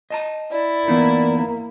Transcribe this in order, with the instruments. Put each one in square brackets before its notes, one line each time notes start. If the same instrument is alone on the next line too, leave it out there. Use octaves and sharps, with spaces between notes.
[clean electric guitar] D#5 A5 A#5
[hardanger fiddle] E4 [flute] D5
[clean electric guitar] E3 B3 D#4 [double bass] A#3